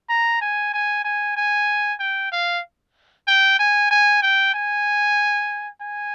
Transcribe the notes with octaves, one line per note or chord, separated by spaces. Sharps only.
A#5
G#5
G#5
G#5
G#5
G5
F5
G5
G#5
G#5
G5
G#5
G#5